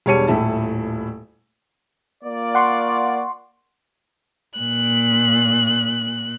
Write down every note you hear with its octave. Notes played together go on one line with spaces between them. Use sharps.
E1 G3 C#5 A5 C#7 D#7
D#1 A2 E4 A5
A#3 F4 D5
F#5 C6 C#6
A#2 F#6